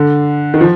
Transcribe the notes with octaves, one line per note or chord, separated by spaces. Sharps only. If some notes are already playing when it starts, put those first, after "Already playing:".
Already playing: D3
D#3
F3